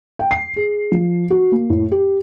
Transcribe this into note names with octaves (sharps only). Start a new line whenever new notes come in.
G5
C7
G#4
F3
F#4
A#3
A2
G4